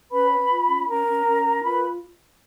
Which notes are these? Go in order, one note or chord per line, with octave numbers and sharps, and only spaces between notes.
C#4 B4 B5
B4
F4
C#4
C#4 A#4 A#5
C#4
C#4
A#4
F4 B4 B5